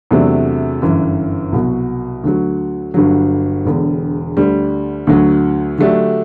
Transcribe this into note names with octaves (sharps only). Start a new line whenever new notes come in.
E2 C3 F#3 A3 D4
G1 F#2 E3
C2 B2 F#3
D2 D3 F#3
G1 G2 D3 F#3
E1 E2 D3
D2 D3 G3
D2 D3 F#3
D3 F#3 A3 D4 G4